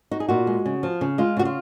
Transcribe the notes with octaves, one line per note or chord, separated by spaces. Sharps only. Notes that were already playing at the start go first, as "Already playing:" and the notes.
D#4 F#4
G#4
A#2 F#4
G#3
C#3
F3
C#3
G#3 F4
C#3 F#4
F4